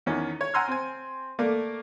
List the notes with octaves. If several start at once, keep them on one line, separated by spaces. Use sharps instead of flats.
E2 D#3 C#4
C#5
F#5 G#5 A#5 C6 E6 F6
C4 G#5
A3 A#3 D5